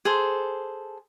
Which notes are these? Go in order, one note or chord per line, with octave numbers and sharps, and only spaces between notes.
G#4 A4 C5